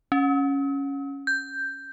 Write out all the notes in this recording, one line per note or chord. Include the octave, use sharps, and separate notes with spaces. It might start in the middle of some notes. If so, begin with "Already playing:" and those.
C#4
G6